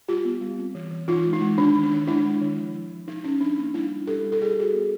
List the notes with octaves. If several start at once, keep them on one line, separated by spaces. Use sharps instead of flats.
G3 F4 G4
B3
G3
C4
E3
E3
E3 D#4 F4
G#3
D#4
G#3
D#3 D4
D#3
D4
D#3
G#3 D4 E4
G#3
D#3
F3
F3
F3
F3 D#4
C#4 D#4
F3 D4
A#3 D#4
G3 D4 E4
G3
G3 G4 A4
G3
A4
G3 G#4
G4
G3 F#4 G#4
B3